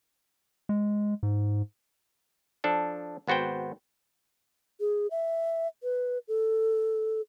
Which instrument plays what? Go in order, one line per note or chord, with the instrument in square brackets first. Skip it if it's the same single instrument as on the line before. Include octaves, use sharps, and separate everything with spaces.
[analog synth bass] G#3
G#2
[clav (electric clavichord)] F3 D4 A4
G#1 B3 F#4 C5 G5
[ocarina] G#4
E5
B4
A4